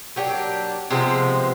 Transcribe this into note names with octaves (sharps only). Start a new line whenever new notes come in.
F#3 A#3 D4 G4
C3 F3 G#3 B3